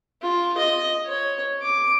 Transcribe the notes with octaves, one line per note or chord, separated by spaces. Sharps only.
F4
D#5
C#5
D6